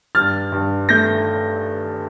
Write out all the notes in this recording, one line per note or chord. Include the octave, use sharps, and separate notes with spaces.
G2 F6 A6
G2
A3 G6 A#6